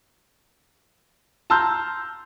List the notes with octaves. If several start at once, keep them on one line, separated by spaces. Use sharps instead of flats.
A5 A#5 C6 E6 F6 G6